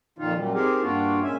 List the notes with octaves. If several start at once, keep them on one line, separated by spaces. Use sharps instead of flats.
F2 A#2 D#3 D#4 F4
F#2 A#2 G3
C4 D#4 G4 G#4 A#4
G2 A#3 D4 F4 F#4
A#2 G#3 C#4 E5 G#5